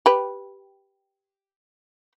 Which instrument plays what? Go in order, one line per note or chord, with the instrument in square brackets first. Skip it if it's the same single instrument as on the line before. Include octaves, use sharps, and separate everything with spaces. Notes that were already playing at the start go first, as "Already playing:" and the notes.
[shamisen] G4 B4